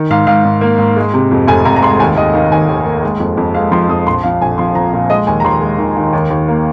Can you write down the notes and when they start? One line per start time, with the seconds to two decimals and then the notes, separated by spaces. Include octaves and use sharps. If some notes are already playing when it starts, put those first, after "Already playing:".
Already playing: D#3
0.10 G#2 F5
0.27 G#2 F5
0.45 G#2
0.61 A#3
0.78 G#2
0.96 G#3
1.14 C3
1.31 F2
1.47 F1 G#5
1.65 F1 A#5
1.76 A#5
1.83 G#3 C6
1.99 D#2 G#5
2.16 D#2 D#5
2.34 D#3 F5
2.51 D#2 G#5
2.68 D#2
2.86 A#3
3.03 G#3
3.20 F2
3.37 F2
3.54 G#3 F5
3.72 F3 C6
3.89 F2 D#6
4.07 A#1 C6
4.24 F3 F5
4.41 A#1 G#5
4.58 F3 C6
4.75 F3 A#5
4.93 A#2
5.10 G#3 D#5
5.27 D#2 G#5
5.40 A#5
5.44 D#2 C6
5.62 G#3
5.78 D#3
5.97 D#3
6.13 D#2
6.30 D#2
6.48 A#3